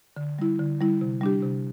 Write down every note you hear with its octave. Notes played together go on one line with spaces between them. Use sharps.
D3
G3 E4
D3
G3 E4
C3
G3 D4 G4
C3